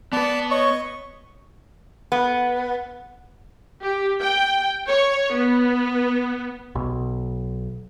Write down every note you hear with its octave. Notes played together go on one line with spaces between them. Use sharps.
B3 B4 D5 A5
C#5 D#5 C#6
B3
G4
G5
C#5
B3
B1